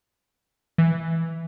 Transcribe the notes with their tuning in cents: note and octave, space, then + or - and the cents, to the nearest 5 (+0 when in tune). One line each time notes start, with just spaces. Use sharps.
E3 +0